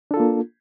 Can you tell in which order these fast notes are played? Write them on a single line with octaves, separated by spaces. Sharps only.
D4 A4 F4 A#3